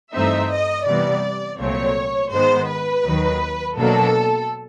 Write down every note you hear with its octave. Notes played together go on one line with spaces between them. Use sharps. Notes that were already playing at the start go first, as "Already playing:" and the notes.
G2 E3 A3 C4 D#4 E5
D#5
C3 E3 G3 B3 D5
C2 A#2 F#3 A3 C4 C#5
G#2 D#3 G#3 B3 C5
B4
D#2 D#3 F#3
B2 F#3 A#3 D4 A4